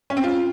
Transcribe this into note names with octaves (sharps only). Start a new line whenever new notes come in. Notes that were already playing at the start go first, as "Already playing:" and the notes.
C#4
C4
F4